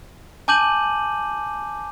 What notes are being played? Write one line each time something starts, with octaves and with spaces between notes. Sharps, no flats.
G#5 A5 D6 G6 D#7 F#7